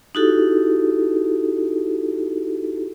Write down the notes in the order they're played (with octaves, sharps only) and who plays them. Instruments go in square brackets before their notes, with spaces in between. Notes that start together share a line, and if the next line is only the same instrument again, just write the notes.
[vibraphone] D#4 E4 F#4 G4 A4